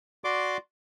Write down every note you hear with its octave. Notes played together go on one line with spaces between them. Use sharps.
F#4 D5 C6 D6